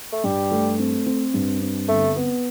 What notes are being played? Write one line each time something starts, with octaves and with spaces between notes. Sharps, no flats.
A3
G2 G3
A3
C4
C4
G2
C4
G1 A3
B3